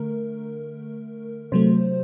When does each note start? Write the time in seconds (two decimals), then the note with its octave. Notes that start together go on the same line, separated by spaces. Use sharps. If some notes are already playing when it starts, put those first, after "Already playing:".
Already playing: D3 A3 A#4
1.52 C3 F#3 A3 C5